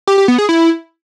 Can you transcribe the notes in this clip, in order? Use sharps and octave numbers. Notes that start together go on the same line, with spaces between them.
G4
G4
B3
G#4
E4